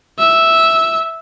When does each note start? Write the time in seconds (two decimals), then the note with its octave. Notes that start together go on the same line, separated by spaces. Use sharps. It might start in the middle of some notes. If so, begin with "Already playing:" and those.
0.19 E5